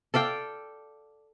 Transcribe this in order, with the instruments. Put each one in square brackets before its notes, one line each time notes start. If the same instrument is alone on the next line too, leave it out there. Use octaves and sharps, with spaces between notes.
[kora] A4 D5 F5 G5